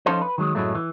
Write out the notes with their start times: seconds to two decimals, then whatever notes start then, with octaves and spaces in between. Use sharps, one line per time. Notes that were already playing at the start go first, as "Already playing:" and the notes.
0.06 F3 C#4 D#4 F4 A4 C5
0.22 B4
0.38 D#3 F#3 G#3
0.55 F#2 A2 C#3 F#3 G#3 A3
0.75 E3